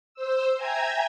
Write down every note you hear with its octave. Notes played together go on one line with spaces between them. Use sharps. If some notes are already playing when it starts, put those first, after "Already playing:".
C5 E6
E5 G5 G#5 A#5 G#6